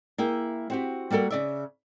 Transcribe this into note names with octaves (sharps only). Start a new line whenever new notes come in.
A#3 E4 G#4 G5
C4 F#4 G4
G3 A#3 F#4 A4 A#4
C#3 D5 E5